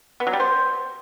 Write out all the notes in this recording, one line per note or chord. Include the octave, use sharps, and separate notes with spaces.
B3
F#3
G3
C5